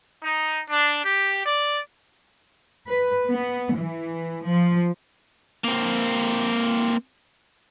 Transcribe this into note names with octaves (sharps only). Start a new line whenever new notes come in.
D#4
D4
G4
D5
B4
B3
E3
F3
A#3 C4